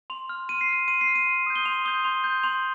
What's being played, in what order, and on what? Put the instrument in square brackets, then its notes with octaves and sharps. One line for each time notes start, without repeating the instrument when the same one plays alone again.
[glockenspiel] C6 F7
F6
C6 D#7
C7
F6 D#7
C6 D#7
C7
F6
D#7
C6
D#6 G6
G7
C6 F7
D#6 G6 G7
C6 F7
G6
C6 F7